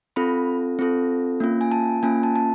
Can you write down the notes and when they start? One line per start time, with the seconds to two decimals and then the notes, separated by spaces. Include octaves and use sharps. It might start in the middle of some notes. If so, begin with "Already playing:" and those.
0.16 C4 F4 A4 B5
0.79 C4 F4 A4
1.40 A#3 C#4 F4
1.61 G#5
1.71 A5
2.03 A#3 C#4 F4 G#5
2.23 A5
2.36 A5